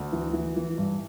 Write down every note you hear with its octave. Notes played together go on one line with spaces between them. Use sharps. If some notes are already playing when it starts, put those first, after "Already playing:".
Already playing: D2
E3
E3
E3
G2